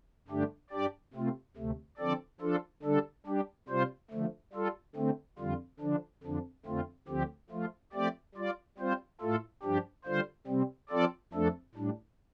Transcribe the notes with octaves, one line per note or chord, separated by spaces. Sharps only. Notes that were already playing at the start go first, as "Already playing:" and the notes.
G2 D3 A3 D4 G4
G2 G3 D4 G4 D5
C3 A3 C4 F4
D2 C3 A3
D3 F3 C4 A4 D5
F3 D4 F4 A4
D3 G3 D4 A4
G3 D4 G4
C3 G3 F4 C5
D3 F3 A3
G3 F4 A4
D3 A3 C4
F2 D3 G3 F4
D3 F3 D4
F2 D3 F3 D4
F2 D3 A3 C4 F4
D2 D3 F3 C4 G4
F3 A3 F4
F3 A3 C4 G4 D5
G3 F4 D5
G3 C4 F4 C5
A2 A3 F4 A4
G2 F3 D4 G4
D3 G3 F4 C5
C3 G3 C4
F3 C4 F4 A4 D5
F2 F3 A3 D4 A4
A2 G3 D4